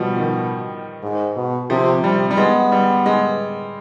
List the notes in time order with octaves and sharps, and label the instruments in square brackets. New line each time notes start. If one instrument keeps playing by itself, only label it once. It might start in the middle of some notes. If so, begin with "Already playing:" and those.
Already playing: [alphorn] B2 [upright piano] F3 G3
[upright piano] D#3
[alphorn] G#2
B2
[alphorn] C3 [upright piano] F3
[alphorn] C3 [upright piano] G3
[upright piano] G3
[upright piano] G#3 [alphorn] B3
[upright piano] G3
G#3